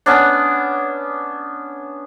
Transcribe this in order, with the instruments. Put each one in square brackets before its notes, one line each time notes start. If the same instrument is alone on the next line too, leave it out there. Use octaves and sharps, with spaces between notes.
[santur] B3 C#4 D4